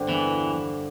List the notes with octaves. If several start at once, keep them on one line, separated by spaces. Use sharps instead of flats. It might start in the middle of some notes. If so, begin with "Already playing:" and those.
Already playing: G2 D3 C4
E2 E3